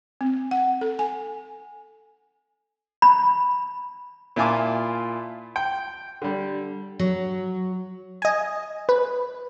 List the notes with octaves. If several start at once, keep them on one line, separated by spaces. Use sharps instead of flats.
C4
F#5
A4
G#5
B5
A#2 E4 F4 G#5 A5 D6
G5
D3 G3
F#3
D#5 G#5
B4